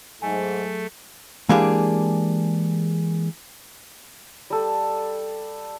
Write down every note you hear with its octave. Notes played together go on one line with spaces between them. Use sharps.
G#2 F#3 A3 G#4 A4 G#5
E3 G#3 A#3 D4 G4 G#4
G3 A4